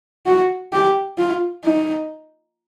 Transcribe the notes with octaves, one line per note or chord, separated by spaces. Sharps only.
F#4
G4
F4
D#4